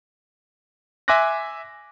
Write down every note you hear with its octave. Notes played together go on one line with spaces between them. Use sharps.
E5 G#5 C6 D6 F#6 A#6